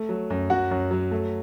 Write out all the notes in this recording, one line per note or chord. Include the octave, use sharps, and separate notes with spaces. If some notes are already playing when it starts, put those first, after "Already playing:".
Already playing: A3
F#3
F#2
F#2 F#4 F#5
F#2
F#3
A3